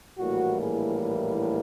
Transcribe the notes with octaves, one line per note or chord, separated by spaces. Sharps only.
A#1 A2 E3 G3 A#3 F#4
G#4